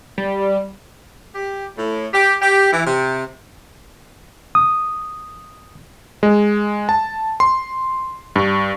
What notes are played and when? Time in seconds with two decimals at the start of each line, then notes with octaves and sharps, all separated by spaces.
0.18 G3
1.34 G4
1.77 A2
2.13 G4
2.41 G4
2.72 E3
2.86 C3
4.55 D#6
6.23 G#3
6.89 A5
7.40 C6
8.36 G2